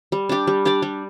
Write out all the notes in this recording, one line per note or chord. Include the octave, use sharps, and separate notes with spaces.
G3
D4 G4 D5
G3
D4 G4 D5
G3